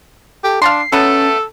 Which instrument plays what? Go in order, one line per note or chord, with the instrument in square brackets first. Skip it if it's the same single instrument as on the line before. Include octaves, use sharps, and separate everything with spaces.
[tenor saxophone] G4 [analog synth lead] A4
[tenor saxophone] D4 [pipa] F5 A5 C6 [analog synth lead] C7
[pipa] F#3 A3 B3 [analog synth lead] C#4 [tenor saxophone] A4